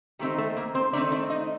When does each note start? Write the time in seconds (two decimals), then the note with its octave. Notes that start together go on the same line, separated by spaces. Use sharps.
0.19 D#3 A3 C4 D#4 G4
0.38 A3 A4
0.56 A#3 A#4
0.75 C4 C5
0.93 D#3 A3 C4 D4 D#4 D5
1.12 D4 D5
1.30 D#4 D#5